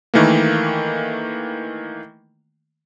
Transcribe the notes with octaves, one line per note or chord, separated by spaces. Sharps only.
D#3 E3 A3 A#3